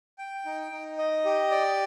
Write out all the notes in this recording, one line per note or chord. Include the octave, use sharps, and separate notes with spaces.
G5
D#4
D#4
D#5
G4
D5